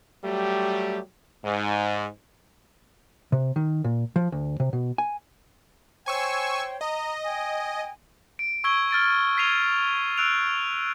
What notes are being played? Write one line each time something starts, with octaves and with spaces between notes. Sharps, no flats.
F#3 G3 A3 G4
G#2
C3
D#3
A#2
F3
D2
C3
B2
G#5
C5 C#5 G5 G#5 C#6 E6
D#5 A#5
G5 G#5
D7
C#6 E6 G#6 D7 G7
F6 A6 D7
G#6 B6 C7 D#7 F7 G7
E6 F#6 D7 F7